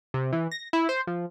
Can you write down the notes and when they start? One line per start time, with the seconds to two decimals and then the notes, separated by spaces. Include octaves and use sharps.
0.14 C3
0.33 E3
0.52 A#6
0.73 E4
0.89 C5
1.07 F3